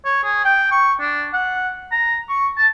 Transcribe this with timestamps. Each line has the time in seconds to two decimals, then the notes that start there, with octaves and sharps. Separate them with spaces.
0.05 C#5
0.24 G#4
0.45 G5
0.71 C#6
1.00 D4
1.34 F#5
1.92 A#5
2.29 C#6
2.58 A5